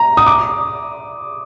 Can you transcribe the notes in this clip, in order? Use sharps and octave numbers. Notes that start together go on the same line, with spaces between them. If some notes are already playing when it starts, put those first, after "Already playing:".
Already playing: A#5
D#6
D6